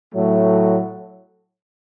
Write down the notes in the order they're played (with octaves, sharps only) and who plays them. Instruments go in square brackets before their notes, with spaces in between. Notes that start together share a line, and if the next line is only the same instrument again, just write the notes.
[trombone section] A2 F#3 A3